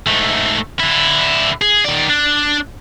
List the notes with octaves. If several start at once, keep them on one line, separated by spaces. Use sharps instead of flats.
G#2 A3
D3 E4
G#4
D#3 D5
D4